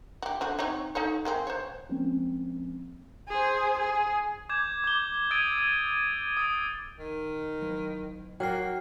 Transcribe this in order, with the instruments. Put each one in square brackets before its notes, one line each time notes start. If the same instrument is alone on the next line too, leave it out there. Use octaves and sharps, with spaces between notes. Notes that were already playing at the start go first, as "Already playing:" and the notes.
[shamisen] F#4 G4
D3 F3 F#4
C4 D#4 C#5
D#4 A4 C#5
G#3 A#3 C4
C5 C#5
[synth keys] F3 G#3 A#3 C4 C#4
[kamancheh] G#4 C5
G#4
[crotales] D6 G6 G#6 E7
D6 G7
D#6 E6 G#6 A6 D7 D#7
E6
D#6 E6 A6 D7
[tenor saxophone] D#3
[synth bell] F#3
[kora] F#3 [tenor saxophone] A#3 [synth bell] G5 F6 C7